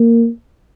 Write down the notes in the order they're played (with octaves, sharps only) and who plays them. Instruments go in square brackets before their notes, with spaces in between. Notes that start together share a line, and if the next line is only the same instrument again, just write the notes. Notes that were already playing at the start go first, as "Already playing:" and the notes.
Already playing: [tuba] A#3